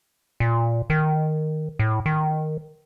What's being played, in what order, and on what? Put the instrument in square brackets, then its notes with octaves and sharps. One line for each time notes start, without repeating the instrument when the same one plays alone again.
[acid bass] A#2
D#3
A2
D#3